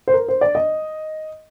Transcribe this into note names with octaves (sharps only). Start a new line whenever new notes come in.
C5
A#4
C5
D5
D#5